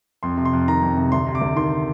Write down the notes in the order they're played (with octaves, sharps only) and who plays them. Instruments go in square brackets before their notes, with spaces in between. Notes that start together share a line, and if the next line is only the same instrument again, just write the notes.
[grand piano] F2 C6
C3
C6
F2
D#3 A#5
F2
C3
D2 C6
C3
D6
D2
D#3 C6